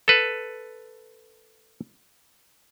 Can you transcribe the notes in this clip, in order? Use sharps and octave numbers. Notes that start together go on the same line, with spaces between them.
A4 B4